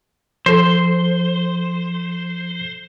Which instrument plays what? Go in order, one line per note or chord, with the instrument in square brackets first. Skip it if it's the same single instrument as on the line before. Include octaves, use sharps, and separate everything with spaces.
[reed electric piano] F3 A4 [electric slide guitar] C5